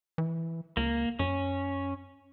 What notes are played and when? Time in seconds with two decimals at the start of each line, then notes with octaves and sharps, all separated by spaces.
0.18 E3
0.77 C#2 A#3
1.19 F#2 C#4